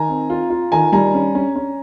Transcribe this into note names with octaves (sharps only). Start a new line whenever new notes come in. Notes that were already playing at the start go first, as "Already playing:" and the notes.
Already playing: D#3 G#5 A#5
C4
F4
F4
D#3 G#5 A#5
G3 G#5 A#5
C#4
C#4
C#4